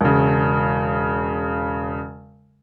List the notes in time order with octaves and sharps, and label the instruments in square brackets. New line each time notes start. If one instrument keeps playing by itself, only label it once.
[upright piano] E1 C#3